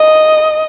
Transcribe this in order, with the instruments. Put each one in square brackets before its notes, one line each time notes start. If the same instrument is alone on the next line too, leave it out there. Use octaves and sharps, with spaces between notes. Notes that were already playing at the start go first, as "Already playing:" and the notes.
Already playing: [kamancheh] D#5